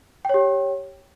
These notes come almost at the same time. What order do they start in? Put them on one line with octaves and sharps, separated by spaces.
G5 C#5 G4